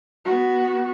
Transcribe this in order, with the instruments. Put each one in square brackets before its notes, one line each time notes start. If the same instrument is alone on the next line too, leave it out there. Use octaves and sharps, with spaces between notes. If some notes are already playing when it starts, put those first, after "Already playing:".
[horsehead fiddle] B3 F#4